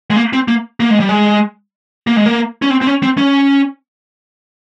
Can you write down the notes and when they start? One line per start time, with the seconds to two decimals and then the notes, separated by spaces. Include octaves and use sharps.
0.11 G#3
0.16 A#3
0.33 C4
0.48 A#3
0.80 A#3
0.91 G#3
1.00 G3
1.09 G#3
2.07 A#3
2.17 G#3
2.26 A#3
2.62 C#4
2.70 C4
2.82 C4
2.87 C#4
3.03 C4
3.17 C#4